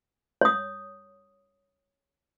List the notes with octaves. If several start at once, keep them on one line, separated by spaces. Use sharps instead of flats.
C#5 D#6